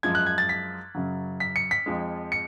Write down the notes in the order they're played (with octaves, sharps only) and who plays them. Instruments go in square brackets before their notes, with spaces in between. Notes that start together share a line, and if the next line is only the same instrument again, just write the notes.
[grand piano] F#2 F3 G#3 G#6
F#6
G#6
A6
B6
F#2 C#3 F#3
B6
C#7
B6
F2 F3 G#3
C#7